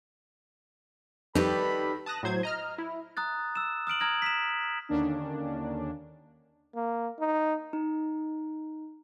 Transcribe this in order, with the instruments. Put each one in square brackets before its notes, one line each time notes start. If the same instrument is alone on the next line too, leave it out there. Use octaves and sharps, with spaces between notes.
[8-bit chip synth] F2 [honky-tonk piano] D#3 G3 [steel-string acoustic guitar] G4 B4 D5 [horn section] A4 B5
[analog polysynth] A5 D#6 F#6 A#6
A2 F#3 C5 G#6
D#5 A#5 F6
E4
[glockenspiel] A#5 D#6 F#6 A6
E6 E7
D#6 F6 D7 F#7
A#5 D#6 F6 G#6 A#6 F#7
B6 E7
[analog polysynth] D#2 D3 D#3 A#3 C#4 D4
[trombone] A#3
D#4
[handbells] D#4